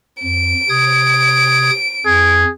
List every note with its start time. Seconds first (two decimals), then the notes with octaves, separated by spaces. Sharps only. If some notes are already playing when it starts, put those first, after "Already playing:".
0.23 F2 D7
0.69 C3 D#6 G#6
2.06 F2 G#4